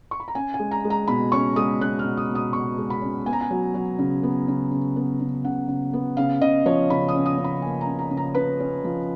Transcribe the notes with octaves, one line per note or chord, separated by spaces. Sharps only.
C#6
B5
A#5
C#4 G#5
G#5
G#3
A#5
G#3
A#5
B2 B5
C#4 C#6
G#3 D#6
C#4 F#6
F6
B2
D#6
B2
D#6
B2 C#6
G#3
B5
C#4
B3 G#5
A#5
G#5
F#3
F#3
C#3
B3
C#3
C#3
B3
C#3
C#3 F#5
C#3
B3
C#3 F5
C#3 D#5
F3 C#5
C#3 B5
D#6
C#4
D#6
C#4
B5
A#3 G#5
A#5
C#3
A#5
C#3
A#5
C#3 B4
C#4
F3